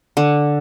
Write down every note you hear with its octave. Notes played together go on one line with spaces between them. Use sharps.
D3